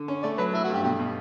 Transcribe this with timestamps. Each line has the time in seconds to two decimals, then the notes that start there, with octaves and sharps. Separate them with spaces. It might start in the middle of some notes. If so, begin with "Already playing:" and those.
Already playing: D3
0.08 C#4
0.23 A3 D5
0.38 F#3 B4
0.53 A3 E4
0.64 F#4
0.69 G2 G4
0.84 B2 G4
0.99 B2